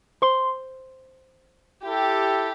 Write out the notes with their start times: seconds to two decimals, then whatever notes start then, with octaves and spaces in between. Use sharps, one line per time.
0.22 C5 C6
1.85 E4 G4 A4